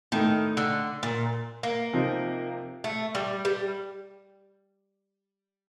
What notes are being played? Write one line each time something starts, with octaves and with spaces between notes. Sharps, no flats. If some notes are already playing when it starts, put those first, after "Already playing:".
A2 D#3 A3 D#4
D3
A#2
A#3
C3 F3 C4 D#4
A3
G3
G3